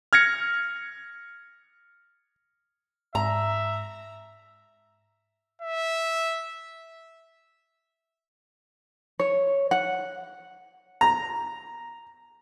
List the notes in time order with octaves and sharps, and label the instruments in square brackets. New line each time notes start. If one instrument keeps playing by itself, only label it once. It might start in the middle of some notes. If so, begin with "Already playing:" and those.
[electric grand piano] F6 G#6 A#6 C#7
[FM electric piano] G#2 [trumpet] E5 [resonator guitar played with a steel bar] A#5
[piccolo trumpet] E5
[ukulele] C#5
F#5
[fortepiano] A#5